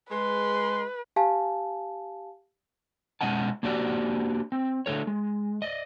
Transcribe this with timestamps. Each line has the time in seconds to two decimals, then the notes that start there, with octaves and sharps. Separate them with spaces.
0.11 G#3 B4 C6
1.16 G4 F5 G#5 A5
3.21 B2 G#3 C#4 D#5 F#5 A5
3.63 A#3 D4 F#4 G4 C5 D5
4.52 C4
4.86 D3 A3 A#4 C#5
5.07 G#3
5.62 D5 D#5